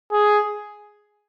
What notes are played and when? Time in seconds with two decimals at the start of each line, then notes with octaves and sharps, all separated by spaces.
0.12 G#4